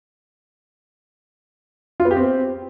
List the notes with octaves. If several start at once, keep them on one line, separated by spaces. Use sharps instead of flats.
F4
B3
G4
C4